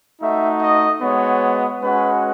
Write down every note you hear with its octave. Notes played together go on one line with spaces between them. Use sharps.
A3 D#4 F#4 E5
D#5
G#3 B3 F#4 C#5
G#3 C#4 F#4 B4